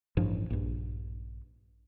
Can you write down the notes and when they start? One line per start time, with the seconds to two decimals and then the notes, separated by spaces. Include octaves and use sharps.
0.17 A1 G2 F3
0.50 A#1 G2